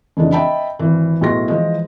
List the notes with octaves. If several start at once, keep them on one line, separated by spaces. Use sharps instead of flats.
F1 C#3 E3 G#3 D4 D5
D#5 E5 G5 A5 B5
G#1 E3
B1 A2 G#4 C6 A#6
E3 F3 G#3